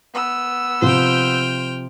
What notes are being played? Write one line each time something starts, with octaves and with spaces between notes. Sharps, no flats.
B3 E6
C3 F3 C5 G5 F6